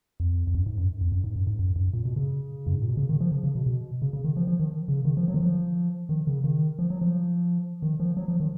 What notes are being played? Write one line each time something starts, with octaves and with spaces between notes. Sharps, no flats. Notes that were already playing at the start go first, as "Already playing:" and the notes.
F2
F2
F#2
G#2
F#2
F2
F#2
G#2
F#2
G#2
F#2
F#2
A#2
B2
C#3
F#2
G#2
A#2
B2
C#3
D#3
F3
C#3
C#3
B2
B2
C#3
C#3
D#3
F3
F3
D#3
C#3
D#3
F3
F#3
D#3
F3
D#3
C#3
D#3
F3
F#3
F3
D#3
F3
F#3
F3
D#3